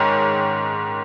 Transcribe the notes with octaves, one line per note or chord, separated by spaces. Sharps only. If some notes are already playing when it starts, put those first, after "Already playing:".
Already playing: G#2 D#3 C#4